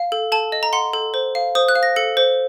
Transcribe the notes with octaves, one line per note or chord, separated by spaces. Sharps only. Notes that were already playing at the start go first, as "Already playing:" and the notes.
Already playing: F5
A4
A4 A5
D#5
A#5
F#5 C6
A4
C5
F5
C5 D#6
F#6
F5
A#6
A4 C#7
C5